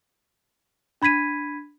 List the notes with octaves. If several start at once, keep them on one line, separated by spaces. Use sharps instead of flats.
D4 B5 G#6 B6 D#7